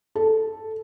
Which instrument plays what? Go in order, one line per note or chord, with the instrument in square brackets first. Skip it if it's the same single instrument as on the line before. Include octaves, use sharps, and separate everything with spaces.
[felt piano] A4